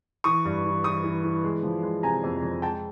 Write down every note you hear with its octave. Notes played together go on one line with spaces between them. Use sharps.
E3 C#6 D#6
G2
E3
E3 C#6 D#6
E3
E3
G#3
F3
G#3
C3 G#5 A#5
F2
F2
G#3 G5 A5